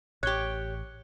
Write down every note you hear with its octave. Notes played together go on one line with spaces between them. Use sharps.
A1 G4 C#5 F#6 G7